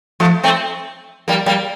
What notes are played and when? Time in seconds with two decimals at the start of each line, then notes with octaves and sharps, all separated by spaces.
0.20 F3 A3
0.43 A3 C4
1.28 G3 A#3
1.46 G3 A#3